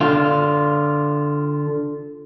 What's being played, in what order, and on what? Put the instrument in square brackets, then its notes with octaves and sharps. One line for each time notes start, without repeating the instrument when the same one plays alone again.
[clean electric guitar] D3 F4